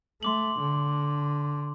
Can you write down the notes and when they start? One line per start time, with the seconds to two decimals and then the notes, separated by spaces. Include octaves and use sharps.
0.23 A3 C6 D6 F#7
0.60 D3